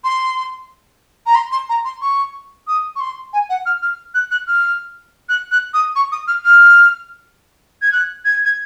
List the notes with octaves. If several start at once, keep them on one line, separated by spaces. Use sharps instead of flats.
C6
A#5
C6
C6
A#5
C6
C#6
D#6
C#6
C6
G#5
F#5
F6
F6
F#6
F#6
F6
F#6
F#6
D#6
C#6
D#6
F6
F6
G#6
F#6
G#6
G#6